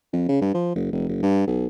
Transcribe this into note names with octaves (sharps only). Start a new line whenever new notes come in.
F2
C#3
G2
F3
F#1
F1
F#1
G2
B1